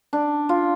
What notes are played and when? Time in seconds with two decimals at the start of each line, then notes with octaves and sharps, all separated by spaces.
0.13 D4
0.49 F4